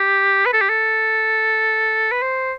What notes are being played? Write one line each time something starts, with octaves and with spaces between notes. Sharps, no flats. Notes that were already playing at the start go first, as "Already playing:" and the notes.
Already playing: G4
B4
A4
G4
A4
B4
C5